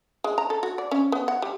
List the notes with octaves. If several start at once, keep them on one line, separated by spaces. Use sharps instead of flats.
G#3
A#5
A4
F#4
D5
C#4
B3
F#5
G3